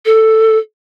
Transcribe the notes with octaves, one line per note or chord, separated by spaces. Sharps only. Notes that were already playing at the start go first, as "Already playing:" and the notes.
A4